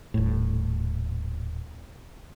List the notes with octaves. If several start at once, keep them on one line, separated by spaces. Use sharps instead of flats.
D#1 A2